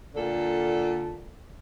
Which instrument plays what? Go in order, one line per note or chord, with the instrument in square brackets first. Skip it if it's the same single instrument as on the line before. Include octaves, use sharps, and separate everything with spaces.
[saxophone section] A#2 D3 A4